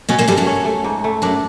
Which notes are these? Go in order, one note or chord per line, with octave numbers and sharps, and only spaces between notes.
B2 B3 C#4
A#2 A#3
G2 G3 A3
F#2 F#3
C#4
A3
G#2
A3
F#2 F#3 D4